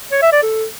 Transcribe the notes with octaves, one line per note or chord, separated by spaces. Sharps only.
C#5
E5
D5
A4